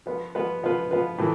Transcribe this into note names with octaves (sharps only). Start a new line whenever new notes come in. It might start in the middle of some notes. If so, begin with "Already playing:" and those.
F3 B3 F4 B4
F3 B3 F4 B4
F3 B3 F4 B4
F3 B3 F4 B4
A2 E3